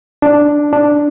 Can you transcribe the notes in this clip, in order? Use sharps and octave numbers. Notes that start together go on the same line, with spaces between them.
D4
D4